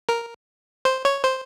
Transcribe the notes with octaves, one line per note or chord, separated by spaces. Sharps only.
A#4
C5
C#5
C5